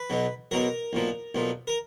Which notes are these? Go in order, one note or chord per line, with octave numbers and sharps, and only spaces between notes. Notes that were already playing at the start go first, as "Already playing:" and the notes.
Already playing: B4
B1 B2 F#3
B1 B2 F#3 A#4
B1 A#2 F3
B1 A#2 F3
A#4